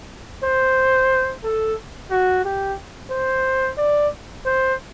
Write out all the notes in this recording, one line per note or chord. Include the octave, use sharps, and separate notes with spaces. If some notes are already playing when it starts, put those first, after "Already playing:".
C5
A4
F#4
G4
C5
D5
C5